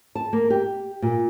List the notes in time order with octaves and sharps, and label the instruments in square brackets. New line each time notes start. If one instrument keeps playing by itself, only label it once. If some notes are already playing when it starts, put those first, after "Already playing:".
[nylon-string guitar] A5
A#3
G4
A#2